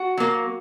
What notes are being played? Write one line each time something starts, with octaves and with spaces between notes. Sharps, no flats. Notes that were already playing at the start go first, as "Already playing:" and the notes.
Already playing: F#4
F#3 A#3